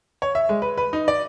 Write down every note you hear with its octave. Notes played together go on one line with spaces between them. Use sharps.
C#5
E5
G#3
B4
B4
D#4
D5